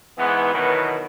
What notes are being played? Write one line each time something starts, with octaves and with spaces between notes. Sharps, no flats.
G#2 E3 B3
B2 D#3 E3 F#3 B3